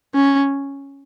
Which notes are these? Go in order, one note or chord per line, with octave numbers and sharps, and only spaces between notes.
C#4